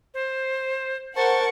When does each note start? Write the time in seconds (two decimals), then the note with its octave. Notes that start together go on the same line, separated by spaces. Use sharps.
0.14 C5
1.16 A#4 C5 F#5 A5 C#6